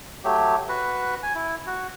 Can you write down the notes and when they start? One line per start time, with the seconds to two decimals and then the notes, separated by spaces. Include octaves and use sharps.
0.24 F#3 A3 G4
0.69 F#4 B4
1.23 G#5
1.35 E4
1.67 F#4